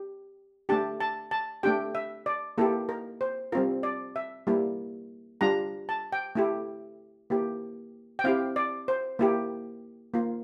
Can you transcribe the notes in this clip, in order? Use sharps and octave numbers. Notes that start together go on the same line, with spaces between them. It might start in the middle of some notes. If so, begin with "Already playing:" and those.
Already playing: G4
A3 D4 G4 A5
A5
A5
A3 D4 G4 G5
E5
D5
A#3 E4 G4 A4
A#4
C5
G3 C4 F4 A#4
D5
E5
G3 A#3 E4
G3 D4 F4 A#5
A5
G5
A3 E4 G4
A#3 E4 G4
G5
C4 E4 G4 F5
D5
C5
A#3 E4 G4
A#3 F4